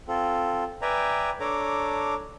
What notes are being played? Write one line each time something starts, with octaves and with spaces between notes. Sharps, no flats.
C4 F4 A4
B4 D5 E5 G5 G#5 A#5
D4 A4 C#5 A#5 D6